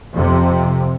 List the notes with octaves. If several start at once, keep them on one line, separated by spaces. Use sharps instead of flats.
F2 C3